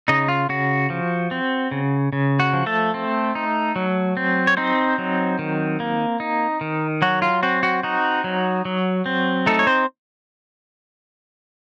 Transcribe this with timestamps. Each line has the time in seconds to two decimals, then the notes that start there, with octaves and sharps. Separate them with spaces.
0.08 C#3 D#4 D#5
0.28 F4
0.49 C#3 F#4
0.90 F3
1.31 C4
1.71 C#3
2.13 C#3
2.40 F#4
2.53 F3
2.66 A3 A4
2.94 C4
3.35 D#4
3.76 F#3
4.17 C4
4.47 C#5
4.57 C4 D#4 C5
4.98 F#3
5.39 D#3
5.80 A#3
6.20 D#4
6.61 D#3
7.02 F#3 F#4
7.22 F4
7.43 C4 F#4
7.63 F#4
7.83 D#4 F#4
8.24 F#3
8.65 F#3
9.06 C4
9.46 A3 D#4 A4
9.59 C#5
9.67 C4 C5